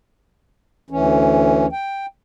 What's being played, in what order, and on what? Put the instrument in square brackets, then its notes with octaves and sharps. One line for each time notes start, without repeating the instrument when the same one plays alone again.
[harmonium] D2 E3 C#4
G5